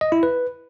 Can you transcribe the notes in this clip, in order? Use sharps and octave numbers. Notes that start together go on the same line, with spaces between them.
D#5
E4
B4